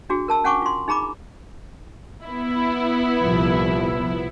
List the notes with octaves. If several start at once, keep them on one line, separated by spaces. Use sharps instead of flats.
D4 F#4 G#4
A#4 A5 E6
C#4 F#5 G#5 C#6 D6
F4 C6
D#4 G#4 A#5 B5 D6
B3 E4
C2 A#2 F3